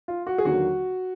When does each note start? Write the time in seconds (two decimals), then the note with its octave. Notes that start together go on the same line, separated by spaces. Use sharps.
0.08 F4
0.27 F#4
0.38 G#4
0.45 D#2 D3 F#3 A#3 F#4